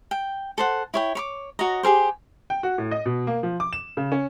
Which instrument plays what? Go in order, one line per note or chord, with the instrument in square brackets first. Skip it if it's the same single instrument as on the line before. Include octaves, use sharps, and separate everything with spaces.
[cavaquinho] G5
A4 C5 F#5
E4 C#5 G5
C#5 B5 D6
F#4 C#5 D#5 A#5
G4 G#4 A#4 C5
[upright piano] G5
F#4
A2
D#5
B2
A#3
F3
D6
E7
C#3
C#4